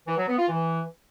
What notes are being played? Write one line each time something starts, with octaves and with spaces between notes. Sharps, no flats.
E3
F#3
B3
F4
E3